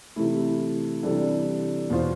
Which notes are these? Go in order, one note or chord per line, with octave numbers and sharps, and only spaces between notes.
C3 E3 A3 E4
C3 E3 G3 D4 A4
E2 B2 B3 F4 C5